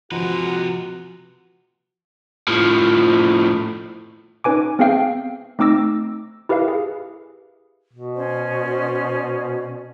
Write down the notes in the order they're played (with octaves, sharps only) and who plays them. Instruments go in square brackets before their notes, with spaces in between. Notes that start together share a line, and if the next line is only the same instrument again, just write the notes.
[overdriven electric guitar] C3 B4 [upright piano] F3 [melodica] G#3 F#5 A#5 [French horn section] F#4
[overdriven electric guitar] A2 F3
[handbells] C#4 D#4 B4 G#5 D6
B3 C4 G#4 E5 F5 G5
A3 C4 D#4 D6 E6 A#6
E4 G4 A#4 B4 E5 F5
G#4
[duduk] B2
[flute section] C#4 C5 D5